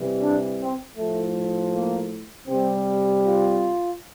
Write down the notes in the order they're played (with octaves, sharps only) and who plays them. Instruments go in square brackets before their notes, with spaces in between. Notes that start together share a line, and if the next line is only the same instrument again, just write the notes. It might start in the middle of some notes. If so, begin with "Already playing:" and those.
Already playing: [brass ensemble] C3 E3 G3
D4
C4
A2 F3 A3
A#3
C3 G3 C4
F4